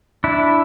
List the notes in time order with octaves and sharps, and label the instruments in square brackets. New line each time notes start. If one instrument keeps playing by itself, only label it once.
[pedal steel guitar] D4 E4